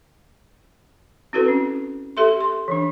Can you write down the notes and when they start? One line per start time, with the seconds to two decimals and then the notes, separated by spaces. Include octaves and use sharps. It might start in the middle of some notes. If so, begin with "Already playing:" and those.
1.33 C4 E4 F#4 A4 B4
1.48 C#4
2.17 G4 A4 E5 C6
2.40 C6
2.68 E3 D4